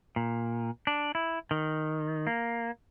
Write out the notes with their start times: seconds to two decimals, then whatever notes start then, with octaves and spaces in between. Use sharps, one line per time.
0.16 A#2
0.87 D4
1.15 E4
1.51 D#3
2.27 A#3